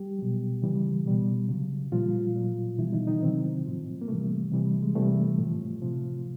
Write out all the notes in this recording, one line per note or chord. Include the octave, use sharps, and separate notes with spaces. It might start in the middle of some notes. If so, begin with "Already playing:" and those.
Already playing: G3 G4
B2 F#3
C#3 E3 G3
B2 G3
C#3 F#3
A#2 F3 G3 F4
A#2 F#3
B2 E3 G3 E4
D#3 D#4
D#3 D#4
C3 D#3 F#3 C4
A2 F3
A#3
C3 E3 G3 A3
C3 E3 G3
G#3
C3 E3 G3 A3
A2 F3
C3 F3